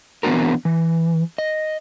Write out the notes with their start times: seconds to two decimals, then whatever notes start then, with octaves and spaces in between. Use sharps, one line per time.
0.23 E3 B3 C4 D4 F#4 A#4
0.65 E3
1.38 D#5